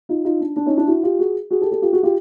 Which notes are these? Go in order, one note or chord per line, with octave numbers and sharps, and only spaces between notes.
D#4 F4
D#4 F4
D4
D4
C#4 D#4
D4 E4
E4 F#4
F4 G4
F#4 G#4
F#4 G#4
G4 A4
G4 A4
F4 G4
F#4 G#4
F4 G4